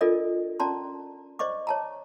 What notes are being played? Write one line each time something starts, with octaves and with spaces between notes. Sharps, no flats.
D4 F4 A4 A#4 D5 D#5
C#4 D5 A5 A#5 C6
C5 D5 D#5 C#6 D6
C#5 A5 A#5